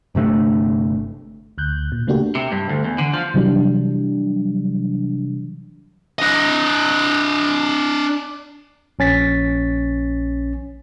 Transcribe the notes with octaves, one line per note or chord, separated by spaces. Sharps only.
G1 C3 A3 D4
D2 F#6 G6
A#2
C#3 A3 A#3 D4 F#4 G4
C3
G2
D2
E2
D3
F3
C3 E3 F#3 G3 D4
D4 D#5
A#1 C#4 A6 B6